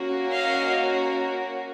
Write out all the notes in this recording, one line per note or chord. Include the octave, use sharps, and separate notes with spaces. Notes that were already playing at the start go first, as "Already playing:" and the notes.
Already playing: A#3 C#4 F#4
D#5 F5